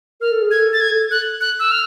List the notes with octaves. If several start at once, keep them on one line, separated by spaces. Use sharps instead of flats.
A#4 F6
A4
G#4
A4 G#6
A6
G#6
F#6
F#6
E6
F6